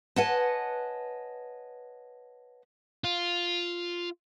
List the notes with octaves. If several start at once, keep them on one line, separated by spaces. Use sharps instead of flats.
B4 C#5 D#5 F#5 G#5 A5
F4